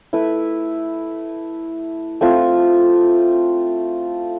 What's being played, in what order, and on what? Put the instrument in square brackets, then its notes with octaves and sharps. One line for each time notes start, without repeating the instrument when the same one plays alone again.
[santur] A3 E4 B4
A3 C4 F4